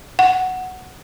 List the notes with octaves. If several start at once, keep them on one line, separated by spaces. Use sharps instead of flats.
F#5